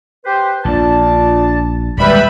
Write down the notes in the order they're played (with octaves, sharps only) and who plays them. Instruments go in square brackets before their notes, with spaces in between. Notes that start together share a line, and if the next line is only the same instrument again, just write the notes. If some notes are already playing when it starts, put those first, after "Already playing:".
[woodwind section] G4 B4 C5
[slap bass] A#1 [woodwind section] D4 F4 A5
[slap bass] D#1 G#3 [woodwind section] G3 [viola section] B4 E5 B5